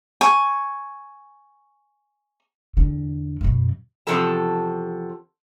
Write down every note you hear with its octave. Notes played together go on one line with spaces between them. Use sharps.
G#5 C#6
E2 D3
F#2 B2
E2 C3 F3 F#4 A4 A5